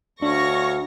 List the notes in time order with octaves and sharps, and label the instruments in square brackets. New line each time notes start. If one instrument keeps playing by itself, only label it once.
[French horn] D2 [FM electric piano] D4 [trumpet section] C#5 F5 [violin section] C#6 A#6